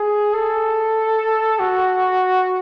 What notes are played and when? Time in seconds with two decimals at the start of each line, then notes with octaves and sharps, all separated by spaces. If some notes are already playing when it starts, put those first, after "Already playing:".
Already playing: G#4
0.33 A4
1.60 F#4